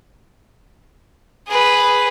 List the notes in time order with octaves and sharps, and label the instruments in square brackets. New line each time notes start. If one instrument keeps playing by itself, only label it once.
[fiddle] G#4 B4